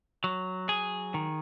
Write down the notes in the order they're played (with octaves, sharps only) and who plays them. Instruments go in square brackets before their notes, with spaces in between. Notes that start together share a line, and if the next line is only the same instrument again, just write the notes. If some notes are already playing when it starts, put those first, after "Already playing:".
[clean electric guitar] F#3
G#4
D#3